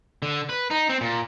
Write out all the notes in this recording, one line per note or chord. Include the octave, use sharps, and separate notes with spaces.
D3
B4
D#4
C4
A#2